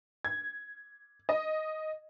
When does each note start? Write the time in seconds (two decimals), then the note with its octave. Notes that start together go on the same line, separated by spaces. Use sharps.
0.25 G#6
1.29 D#5